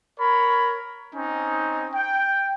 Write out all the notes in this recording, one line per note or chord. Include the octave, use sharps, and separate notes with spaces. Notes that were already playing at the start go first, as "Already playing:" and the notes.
A#4 C#5 B5
C4 C#4 D#4
G5